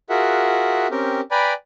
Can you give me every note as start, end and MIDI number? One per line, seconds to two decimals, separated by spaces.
0.10 0.87 65
0.10 0.87 66
0.10 0.87 68
0.10 0.87 70
0.10 0.87 76
0.10 0.87 78
0.91 1.21 60
0.91 1.21 61
0.91 1.21 67
0.91 1.21 70
1.31 1.53 71
1.31 1.53 74
1.31 1.53 79
1.31 1.53 80
1.31 1.53 82
1.31 1.53 83